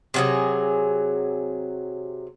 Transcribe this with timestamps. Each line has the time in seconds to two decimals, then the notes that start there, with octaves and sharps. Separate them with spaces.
0.14 C3 F#3 G#4